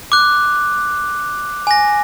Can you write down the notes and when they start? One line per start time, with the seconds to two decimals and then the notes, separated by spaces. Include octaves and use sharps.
0.12 D6 F#6
1.67 G#5 A#6